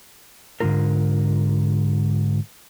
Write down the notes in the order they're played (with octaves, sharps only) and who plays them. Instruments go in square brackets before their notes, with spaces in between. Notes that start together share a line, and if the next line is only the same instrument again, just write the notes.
[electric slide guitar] G#2 D3 G3 C#4 F4 A#4